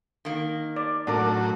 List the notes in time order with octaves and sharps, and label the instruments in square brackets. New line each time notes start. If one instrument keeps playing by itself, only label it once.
[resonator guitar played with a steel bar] D#3 A#3
[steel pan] D5
[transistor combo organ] A2 F#3 [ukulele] D4 A#4 [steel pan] D5